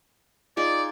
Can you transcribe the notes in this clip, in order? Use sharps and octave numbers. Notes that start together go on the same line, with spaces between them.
D#4 F4 G#4 D5